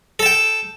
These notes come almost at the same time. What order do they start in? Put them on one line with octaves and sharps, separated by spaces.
A4 A5 G5